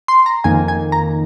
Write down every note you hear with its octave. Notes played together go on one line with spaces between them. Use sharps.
C6
A#5
F2 D#3 A#3 G#5
G#5
A#5